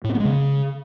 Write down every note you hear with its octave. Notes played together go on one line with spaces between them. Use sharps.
A2
C4
B3
G#3
C#3